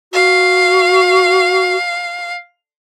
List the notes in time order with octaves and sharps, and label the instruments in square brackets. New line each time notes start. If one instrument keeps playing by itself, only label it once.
[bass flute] F#4 [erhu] F5